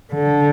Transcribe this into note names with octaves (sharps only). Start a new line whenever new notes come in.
D3